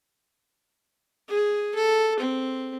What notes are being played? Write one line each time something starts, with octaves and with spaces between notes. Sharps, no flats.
G#4
A4
C4